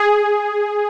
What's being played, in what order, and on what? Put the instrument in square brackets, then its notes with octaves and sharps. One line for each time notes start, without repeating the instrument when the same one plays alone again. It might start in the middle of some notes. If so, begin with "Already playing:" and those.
Already playing: [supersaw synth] G#4